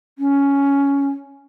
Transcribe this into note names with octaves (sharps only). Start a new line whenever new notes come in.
C#4